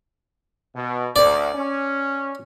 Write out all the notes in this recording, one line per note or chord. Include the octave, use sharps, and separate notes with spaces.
B2
D2 D5
C#4